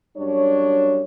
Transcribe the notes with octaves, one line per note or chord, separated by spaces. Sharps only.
F#2 G3 D4 C#5